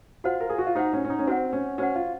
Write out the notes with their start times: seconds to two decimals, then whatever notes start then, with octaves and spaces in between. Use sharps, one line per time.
0.24 F4 F#4 C5 F#5
0.41 A#4
0.49 G#4
0.58 F#4
0.67 F4
0.75 D#4 F#4 C5 F#5
0.93 C#4
1.05 C#4
1.10 D#4
1.19 C#4
1.27 C4 F#4 C5 F#5
1.53 C#4
1.78 C#4 F#4 C5 F#5
1.95 F4